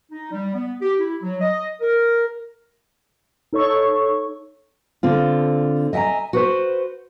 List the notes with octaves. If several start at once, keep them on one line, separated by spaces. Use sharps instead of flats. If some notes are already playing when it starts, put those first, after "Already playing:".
D#4
G3
B3
G4
E4
F#3
D#5
A#4
D#4 A4 C#5 C#6
D3 C4 F4
D#5 E5 G5 G#5 A#5
F#4 B4 C5